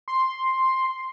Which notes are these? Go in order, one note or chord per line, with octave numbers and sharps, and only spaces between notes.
C6